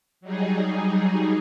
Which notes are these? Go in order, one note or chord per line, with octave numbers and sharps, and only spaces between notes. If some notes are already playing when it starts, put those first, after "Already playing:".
F#3 G3 D#4 G#4